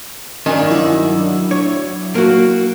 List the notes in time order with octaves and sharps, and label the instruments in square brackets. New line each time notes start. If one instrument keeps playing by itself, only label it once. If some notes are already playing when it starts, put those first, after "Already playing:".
[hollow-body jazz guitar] G2 D#3 [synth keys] C#4 G#5
[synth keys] F#3 D4 E4
[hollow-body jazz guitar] C#5
A#3 F#4